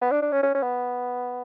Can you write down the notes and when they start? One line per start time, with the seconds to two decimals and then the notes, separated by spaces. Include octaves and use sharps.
0.02 B3
0.11 D4
0.22 D4
0.32 C#4
0.43 C#4
0.55 C#4
0.63 B3